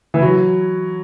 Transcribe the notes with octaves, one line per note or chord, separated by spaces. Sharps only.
E3
F#3